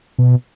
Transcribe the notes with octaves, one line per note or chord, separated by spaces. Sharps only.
B2